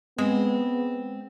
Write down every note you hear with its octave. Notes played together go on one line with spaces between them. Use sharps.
G#3 B3 C4